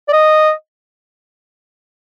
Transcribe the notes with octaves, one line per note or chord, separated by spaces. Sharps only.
D5
D#5